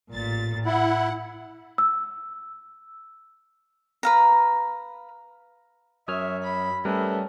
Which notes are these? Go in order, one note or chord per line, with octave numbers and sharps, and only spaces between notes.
A1 A#2 A6
E4 F#5
E6
B4 F5 A#5
F#2 C#5 E5 D#6 F6
B5
G3 A3 C#4 A#4 B4